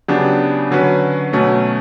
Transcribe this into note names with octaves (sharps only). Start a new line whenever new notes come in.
C#3 F#3 B3 D4 G4
D3 F#3 C#4 F#4 B4
B2 F#3 A3 C#4